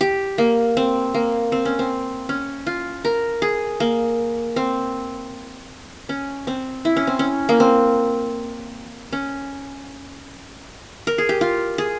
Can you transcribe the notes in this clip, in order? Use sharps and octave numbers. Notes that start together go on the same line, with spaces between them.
G4
A#3
C4
A#3
C4
C#4
C4
C#4
F4
A#4
G#4
A#3
C4
C#4
C4
E4
C#4
C4
C#4
A#3
C4
C#4
A#4
G#4
G4
F4
G#4